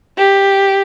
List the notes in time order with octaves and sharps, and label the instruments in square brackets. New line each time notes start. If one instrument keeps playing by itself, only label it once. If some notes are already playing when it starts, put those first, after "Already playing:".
[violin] G4